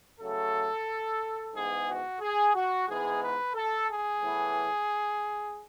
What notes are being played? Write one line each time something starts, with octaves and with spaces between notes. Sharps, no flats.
C#3 F#3 A3 A4
G#2 E3 B3 G#4
F#4
G#4
F#4
G#2 E3 G#3 B3 G#4
B4
A4
G#4
A2 E3 B3